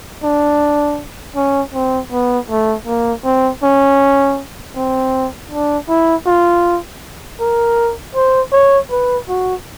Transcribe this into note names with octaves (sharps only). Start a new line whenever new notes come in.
D4
C#4
C4
B3
A3
A#3
C4
C#4
C4
D4
E4
F4
A#4
C5
C#5
B4
F#4